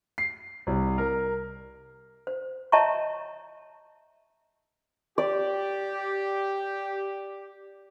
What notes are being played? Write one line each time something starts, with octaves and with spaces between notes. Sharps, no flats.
C7
C2
A#4
C5
C#5 D#5 E5 A5 A#5 C#6
G4 D5